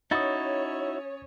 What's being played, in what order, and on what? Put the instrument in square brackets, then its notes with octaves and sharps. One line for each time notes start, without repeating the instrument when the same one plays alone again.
[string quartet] C#4 C#5 [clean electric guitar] D#4 E4 F#4 [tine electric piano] D#6 A6